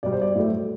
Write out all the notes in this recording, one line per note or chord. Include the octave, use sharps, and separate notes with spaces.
B2 G3 D5
C5
D5
A2 F#3 A3